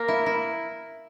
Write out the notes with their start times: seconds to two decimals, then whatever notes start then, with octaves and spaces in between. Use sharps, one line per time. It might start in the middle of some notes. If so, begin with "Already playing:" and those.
Already playing: A#3 A#4
0.08 E4
0.26 E4